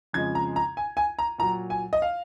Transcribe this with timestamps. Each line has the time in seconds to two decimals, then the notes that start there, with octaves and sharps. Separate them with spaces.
0.13 F2 C#3 F3 G#3 G#6
0.35 A#5
0.56 A#5
0.77 G#5
0.97 G#5
1.19 A#5
1.38 A#2 F#3 A#5
1.70 G#5
1.93 D#5
2.02 F5